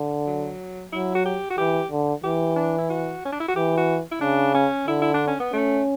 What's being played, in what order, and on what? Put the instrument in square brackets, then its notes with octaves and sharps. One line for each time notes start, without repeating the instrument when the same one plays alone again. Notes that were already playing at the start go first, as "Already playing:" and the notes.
Already playing: [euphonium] D3
[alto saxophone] F#3
[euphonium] F#3 [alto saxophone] E4
[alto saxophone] F#4
G4
F#4
[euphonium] E3 [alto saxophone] G4
[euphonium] D3
[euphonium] E3 [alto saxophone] G4
[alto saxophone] D4
E4
F#4
C#4
D4
E4
F#4
[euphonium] E3 [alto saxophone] G4
[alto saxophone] F#4
E4
[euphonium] C#3 [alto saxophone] D4
[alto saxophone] C#4
[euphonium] D3 [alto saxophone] E4
[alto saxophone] E4
D4
C#4
B3
[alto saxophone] A3 [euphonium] C#4